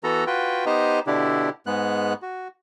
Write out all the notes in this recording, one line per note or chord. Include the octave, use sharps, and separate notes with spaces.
E3 B3 F#4 A4 A#5
F4 F#4 B4 G5
B3 D#4 G4 C5 D#5 A#5
B2 D3 D4 E4 G4
G#2 G#3 B3 F#6
F#4